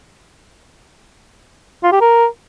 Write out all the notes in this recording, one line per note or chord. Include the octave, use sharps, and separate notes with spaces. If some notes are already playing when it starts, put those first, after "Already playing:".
F4
G4
A#4